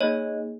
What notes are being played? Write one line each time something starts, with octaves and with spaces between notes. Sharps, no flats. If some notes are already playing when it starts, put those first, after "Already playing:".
A#3 D#4 G#4 C#5 D#5